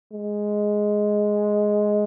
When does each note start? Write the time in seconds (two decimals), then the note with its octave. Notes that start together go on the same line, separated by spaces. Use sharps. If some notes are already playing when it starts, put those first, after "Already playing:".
0.13 G#3